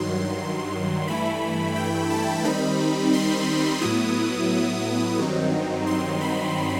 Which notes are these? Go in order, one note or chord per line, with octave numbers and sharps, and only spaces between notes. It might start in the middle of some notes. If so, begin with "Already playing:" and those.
Already playing: G2 D#3 F#3 C6
G2 E3 A3 E4 B5
G5
A5
D#3 G3 C4 D#4 B5
C6
A2 F#3 B3 E4 D#6
G2 D#3 F#3 C4 D#4
C6
B5